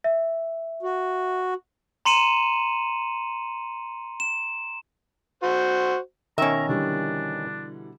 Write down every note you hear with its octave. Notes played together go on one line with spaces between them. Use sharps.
E5
F#4
A#5 C6 C#7 D#7 E7 F#7
E7
F#4 C5
B2 D#3 C#4 E5 A#5
D3 E3 G3 D4